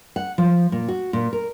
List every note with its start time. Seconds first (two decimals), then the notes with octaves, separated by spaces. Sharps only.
0.16 F#5
0.38 F3
0.72 A#2
0.88 F#4
1.13 A#2
1.33 A#4